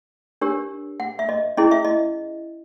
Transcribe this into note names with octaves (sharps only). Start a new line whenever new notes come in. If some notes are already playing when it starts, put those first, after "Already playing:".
D4 G4 A#4 C#5
F#5
E5
D#5
C#4 E4 G#4 D#5
E5
D#5